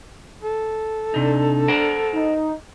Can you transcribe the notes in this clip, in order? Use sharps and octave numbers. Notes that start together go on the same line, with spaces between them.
A4
C3 D4 D#4
A#4 C5 F#5
D#4